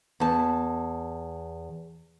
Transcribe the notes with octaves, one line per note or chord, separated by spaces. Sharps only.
E2 A5